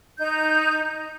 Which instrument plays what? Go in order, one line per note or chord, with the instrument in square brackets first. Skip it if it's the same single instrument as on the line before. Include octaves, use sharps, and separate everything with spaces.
[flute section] D#4 G6